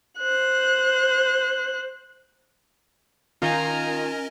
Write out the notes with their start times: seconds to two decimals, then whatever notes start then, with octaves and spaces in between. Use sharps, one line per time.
0.19 C5 F#6
3.42 D#3 C#4 D#4 F4 A#4 D#5 G#5 A#5